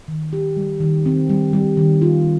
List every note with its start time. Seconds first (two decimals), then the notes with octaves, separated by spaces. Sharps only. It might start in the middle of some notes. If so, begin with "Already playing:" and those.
0.08 D#3
0.33 G4
0.57 G3
0.80 D#3
1.06 C4
1.30 G3
1.53 G3
1.77 D#3
2.01 F4